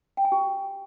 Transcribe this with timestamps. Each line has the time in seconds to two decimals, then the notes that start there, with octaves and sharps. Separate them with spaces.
0.17 G5
0.25 G#5
0.32 G4